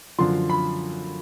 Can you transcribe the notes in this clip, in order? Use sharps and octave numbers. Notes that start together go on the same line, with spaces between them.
F#2 D3 F3 C6
B5